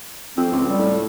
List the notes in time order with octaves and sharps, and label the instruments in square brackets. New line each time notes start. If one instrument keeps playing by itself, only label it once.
[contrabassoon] F2 [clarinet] C4
[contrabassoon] C#2
[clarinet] G3
[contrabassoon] A2